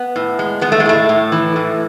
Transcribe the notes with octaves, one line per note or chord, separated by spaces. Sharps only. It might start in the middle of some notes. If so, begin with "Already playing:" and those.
Already playing: B3
A2
G#3
G#3 B3
A3
G#3
A2 A3
A2
E3
A2